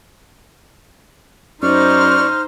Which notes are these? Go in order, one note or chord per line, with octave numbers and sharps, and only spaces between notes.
F#2 D#4 C5 D5 C#6 F6